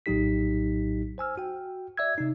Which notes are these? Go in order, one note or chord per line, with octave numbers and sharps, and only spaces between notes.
A#1 A2 F#3 D#4 G4 B6
C5 G#5 E6 F6
F#4 G5
D5 E5 E6 G#6
C3 D#4